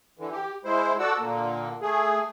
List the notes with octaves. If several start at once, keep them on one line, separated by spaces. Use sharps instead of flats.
D3 E3
G4
G#3 E4 C5
F#4 A4 D5 F#5 E6
A#2 D3 A#3
A3 G#4